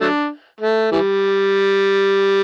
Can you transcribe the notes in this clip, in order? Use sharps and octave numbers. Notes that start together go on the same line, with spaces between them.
F#3 A3 D4
A3
E3 G3